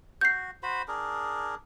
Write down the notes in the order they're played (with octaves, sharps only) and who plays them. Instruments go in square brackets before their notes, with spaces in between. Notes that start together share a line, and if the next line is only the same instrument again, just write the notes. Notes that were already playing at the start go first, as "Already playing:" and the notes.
[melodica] F#4 [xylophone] G6 C7
[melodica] F#4 C5 B5
D4 G#4 A#4